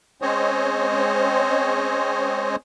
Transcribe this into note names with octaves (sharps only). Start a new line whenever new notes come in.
G#3 C4 C#4 C5 C#5 D#5